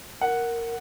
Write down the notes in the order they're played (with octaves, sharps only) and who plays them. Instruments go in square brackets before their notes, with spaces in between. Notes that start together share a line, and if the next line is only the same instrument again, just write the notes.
[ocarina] A#4 [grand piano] F#5